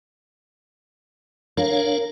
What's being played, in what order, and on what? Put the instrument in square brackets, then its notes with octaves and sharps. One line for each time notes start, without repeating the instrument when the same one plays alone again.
[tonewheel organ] D4 C#5 F5 [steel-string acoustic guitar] A#4